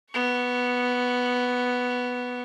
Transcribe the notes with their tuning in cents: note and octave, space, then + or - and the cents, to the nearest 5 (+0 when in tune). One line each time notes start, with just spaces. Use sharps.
B3 +0 C#6 +25